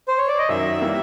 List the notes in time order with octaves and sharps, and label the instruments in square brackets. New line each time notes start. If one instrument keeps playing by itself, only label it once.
[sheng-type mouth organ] C5
C#5
D5
D#5
[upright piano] F#2 D#3 F#3 [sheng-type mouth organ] E5
[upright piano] E3 G3 A#3